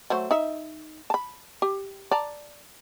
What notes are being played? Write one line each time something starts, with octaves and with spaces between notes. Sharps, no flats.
F#3 A3 C5
D#4 E5
A5 B5
G4
D5 A5 A#5